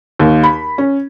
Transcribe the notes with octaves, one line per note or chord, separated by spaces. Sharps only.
D#2
B5
C#4